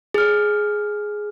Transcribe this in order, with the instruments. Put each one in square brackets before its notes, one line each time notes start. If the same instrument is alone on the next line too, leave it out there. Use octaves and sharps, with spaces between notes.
[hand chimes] G#4 F6